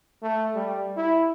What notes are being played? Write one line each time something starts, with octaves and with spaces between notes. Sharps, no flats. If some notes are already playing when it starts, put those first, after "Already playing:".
A3
G3
E4